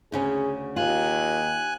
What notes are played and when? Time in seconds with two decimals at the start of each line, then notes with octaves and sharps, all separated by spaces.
0.12 D2 C#3 C#4 G#4
0.76 D#2 F4 G#5 F#6